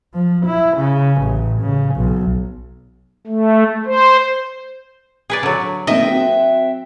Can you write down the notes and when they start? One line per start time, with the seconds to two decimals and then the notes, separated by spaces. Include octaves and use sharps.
0.15 F3
0.46 E4
0.77 C#3
1.22 A1
1.61 C#3
1.96 B1
3.27 A3
3.86 C5
5.30 G#4 B4 D5
5.43 D3 F#3
5.87 A#3 C4 D#4 D#5 E5 G5
6.07 C4 F#4